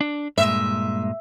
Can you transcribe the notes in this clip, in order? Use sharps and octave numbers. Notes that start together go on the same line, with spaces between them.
D4
G2 A#2 G#3 E5